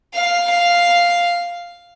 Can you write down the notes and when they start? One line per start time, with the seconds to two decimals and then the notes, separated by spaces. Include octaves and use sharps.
0.14 F5
0.50 F5